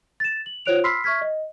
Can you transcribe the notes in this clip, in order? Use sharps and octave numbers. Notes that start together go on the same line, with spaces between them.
A6 E7
F#7
F4 C5 C#5 F#6 D7 F7
B5 C6 E6 F6 B6 C7
E5 C#6 F6 G#6 B6
D#5